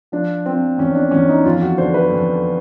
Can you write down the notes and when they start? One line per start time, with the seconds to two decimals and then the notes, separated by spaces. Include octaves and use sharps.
0.12 F3 D4
0.46 F3 C4
0.78 E2 C#4
0.95 D4
1.11 E2 C#4
1.29 D#4
1.44 F2 F4
1.62 F#4
1.78 D3 C5
1.94 B4
2.11 F2